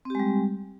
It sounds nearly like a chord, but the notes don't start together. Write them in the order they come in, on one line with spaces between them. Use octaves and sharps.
C4 G4 G#3 G3